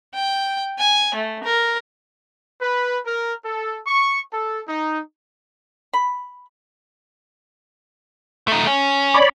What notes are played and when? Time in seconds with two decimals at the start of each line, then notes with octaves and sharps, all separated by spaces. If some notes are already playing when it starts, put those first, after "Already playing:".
0.14 G5
0.79 G#5
1.15 A3
1.44 A#4
2.61 B4
3.05 A#4
3.45 A4
3.87 C#6
4.33 A4
4.68 D#4
5.94 B5
8.48 A3 D#4
8.67 C#4
9.14 C#5 D5 B5